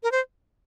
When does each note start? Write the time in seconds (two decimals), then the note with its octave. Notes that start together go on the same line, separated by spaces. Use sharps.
0.03 A#4
0.12 C5